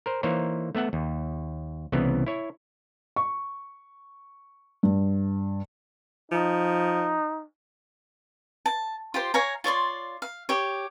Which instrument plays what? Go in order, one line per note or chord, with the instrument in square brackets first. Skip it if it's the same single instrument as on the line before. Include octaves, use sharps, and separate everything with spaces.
[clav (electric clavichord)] A#4 C5
E3 A#3 D#4 C5 C#5
A3 B3 E5 F#5
D#2
C2 C#3 E3 B3
E4 C#5
[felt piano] C#6
G2
[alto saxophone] F3 [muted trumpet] D#4
[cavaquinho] A5
F4 G4 C5
C#5 F5 G#5 A#5
F4 C#5 D5 C6
F5
G4 C#5